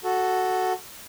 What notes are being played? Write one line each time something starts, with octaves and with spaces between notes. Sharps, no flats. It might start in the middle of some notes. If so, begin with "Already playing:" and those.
F#4 A4